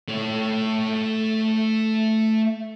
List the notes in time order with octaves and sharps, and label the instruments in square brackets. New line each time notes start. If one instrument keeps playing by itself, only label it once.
[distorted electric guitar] A3 C#5